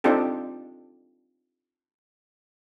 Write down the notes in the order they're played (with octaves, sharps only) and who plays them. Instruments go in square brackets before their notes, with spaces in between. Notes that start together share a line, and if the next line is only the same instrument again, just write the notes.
[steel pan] C4 D4 D#4 F4 G4 A4